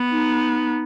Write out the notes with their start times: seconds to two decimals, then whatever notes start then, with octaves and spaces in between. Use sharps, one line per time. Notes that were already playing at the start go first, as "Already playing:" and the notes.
Already playing: B3
0.11 D#4